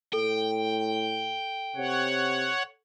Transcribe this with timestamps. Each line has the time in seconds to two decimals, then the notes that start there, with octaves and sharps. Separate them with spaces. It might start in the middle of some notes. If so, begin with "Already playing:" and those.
0.13 A2 A4 G5
1.76 C3 C#5 F#5